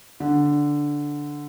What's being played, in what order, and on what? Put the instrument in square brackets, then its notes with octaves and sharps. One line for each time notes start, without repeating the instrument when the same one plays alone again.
[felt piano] D3